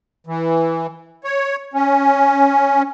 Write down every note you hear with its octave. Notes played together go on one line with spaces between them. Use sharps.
E3
C#5
C#4